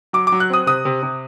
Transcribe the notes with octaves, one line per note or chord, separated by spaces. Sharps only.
F#3 D6
D6
F#3
F#6
C4 D#6
C3 D#6
C3
C3